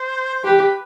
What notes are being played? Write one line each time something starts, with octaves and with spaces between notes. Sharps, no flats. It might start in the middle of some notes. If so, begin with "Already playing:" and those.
Already playing: C5
C5
G4 B4